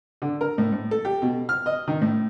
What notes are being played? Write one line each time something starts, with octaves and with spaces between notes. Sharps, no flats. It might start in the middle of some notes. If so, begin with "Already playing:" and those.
D3
A#4
A2
A2
A4
G4
B2
F6
D#5
D#3
A2